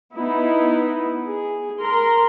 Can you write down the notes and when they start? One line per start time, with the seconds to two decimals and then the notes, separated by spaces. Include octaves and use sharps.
0.16 B3 D#4 E4
1.28 G#4
1.80 A#4 C6